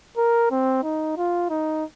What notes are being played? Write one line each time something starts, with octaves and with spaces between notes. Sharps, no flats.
A#4
C4
D#4
F4
D#4